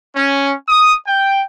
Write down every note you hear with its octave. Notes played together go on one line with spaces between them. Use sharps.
C#4
D#6
G5